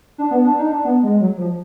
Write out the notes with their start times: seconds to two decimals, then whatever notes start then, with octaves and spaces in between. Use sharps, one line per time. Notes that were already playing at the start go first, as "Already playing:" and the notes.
0.18 D4
0.31 B3
0.45 D4
0.59 D#4
0.71 D4
0.85 B3
1.03 G#3
1.20 F#3
1.38 F3